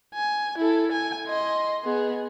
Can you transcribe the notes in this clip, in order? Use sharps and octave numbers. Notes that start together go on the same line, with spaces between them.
G#5
E4 A4
G#5
D#5 C6
B3 G#4